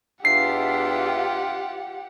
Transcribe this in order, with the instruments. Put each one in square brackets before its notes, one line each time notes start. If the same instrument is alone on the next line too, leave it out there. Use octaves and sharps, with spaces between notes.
[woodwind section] E2 D4 E5 [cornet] F4 [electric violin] G4 F#5 [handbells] C7